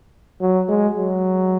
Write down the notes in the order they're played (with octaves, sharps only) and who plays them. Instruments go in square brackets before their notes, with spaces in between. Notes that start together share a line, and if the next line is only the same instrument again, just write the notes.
[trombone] F#3
G#3
F#3